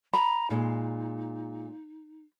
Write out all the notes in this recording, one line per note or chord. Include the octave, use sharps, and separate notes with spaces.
A#5 B5
A#2 G#3 D#4